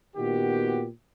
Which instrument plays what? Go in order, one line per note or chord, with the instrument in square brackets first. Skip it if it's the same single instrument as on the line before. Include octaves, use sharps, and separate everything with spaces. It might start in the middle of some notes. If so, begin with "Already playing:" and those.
[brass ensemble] A#2 D#3 B3 F#4 G4